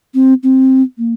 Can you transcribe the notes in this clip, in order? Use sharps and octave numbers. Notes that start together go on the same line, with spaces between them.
C4
C4
A#3